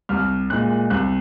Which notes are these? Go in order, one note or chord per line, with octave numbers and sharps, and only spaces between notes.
C2 F6
A#2 G#3 F#6
C2 F#6